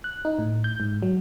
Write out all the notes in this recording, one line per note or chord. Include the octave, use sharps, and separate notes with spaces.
F#6
D#4
A2
G6
G#2
F#3